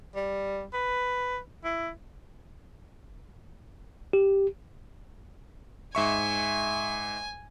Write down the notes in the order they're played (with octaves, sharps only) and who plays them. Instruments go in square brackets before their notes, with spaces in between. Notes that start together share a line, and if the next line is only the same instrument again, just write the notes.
[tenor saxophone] G3
B4
E4
[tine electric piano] G4
[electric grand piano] G#2 E5 C#6 [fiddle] G#5